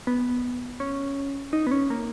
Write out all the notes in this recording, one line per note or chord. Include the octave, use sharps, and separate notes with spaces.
B3
C#4
D#4
B3
C#4
A#3